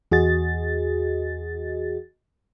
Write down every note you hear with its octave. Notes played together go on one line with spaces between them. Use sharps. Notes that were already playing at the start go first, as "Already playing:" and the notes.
E2 F#4 G#4 D#5 A6